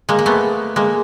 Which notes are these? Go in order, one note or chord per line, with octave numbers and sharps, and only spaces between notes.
G#3 A#3
A#3
A3 B3
G#3 A#3